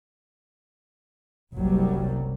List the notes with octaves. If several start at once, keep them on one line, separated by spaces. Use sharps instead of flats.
F#1 C2 F#3 G3